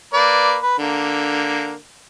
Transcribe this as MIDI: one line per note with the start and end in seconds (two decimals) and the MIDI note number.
0.14 0.57 58
0.14 0.57 71
0.14 0.57 74
0.63 0.76 71
0.79 1.74 50
0.79 1.74 58